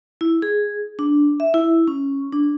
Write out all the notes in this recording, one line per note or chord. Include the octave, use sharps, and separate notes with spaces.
E4
G#4
D4
E5
E4
C#4
D4